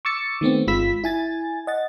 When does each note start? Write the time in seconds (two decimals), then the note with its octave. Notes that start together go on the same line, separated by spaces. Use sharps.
0.05 C#6 D6 E6 A6 C#7
0.41 D#3 A3 B3 C4
0.67 G1 G#3 F4 B5 E6 B6
1.04 E4 G#5 A6
1.67 D#5 F#5 A6